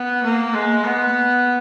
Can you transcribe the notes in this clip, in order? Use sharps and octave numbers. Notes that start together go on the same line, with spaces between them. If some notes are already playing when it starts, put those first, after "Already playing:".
Already playing: B3
A#3
G#3
B3